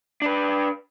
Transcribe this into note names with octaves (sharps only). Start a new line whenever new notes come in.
D4 B4